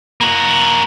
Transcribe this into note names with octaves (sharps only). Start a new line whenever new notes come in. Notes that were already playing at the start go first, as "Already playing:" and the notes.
A#3 F#4